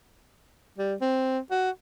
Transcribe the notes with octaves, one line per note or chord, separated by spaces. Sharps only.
G3
C4
F#4